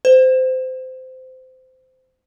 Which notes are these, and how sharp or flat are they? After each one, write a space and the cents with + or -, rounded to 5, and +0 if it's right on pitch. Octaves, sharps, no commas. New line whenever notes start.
C5 -20